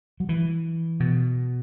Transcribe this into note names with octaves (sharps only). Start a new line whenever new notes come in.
F#3
E3
B2